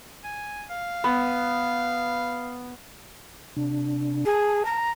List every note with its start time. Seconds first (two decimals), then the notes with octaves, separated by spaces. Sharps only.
0.24 G#5
0.70 F5
1.04 B3
3.57 C3 D4
4.25 G#4 A5
4.65 A#5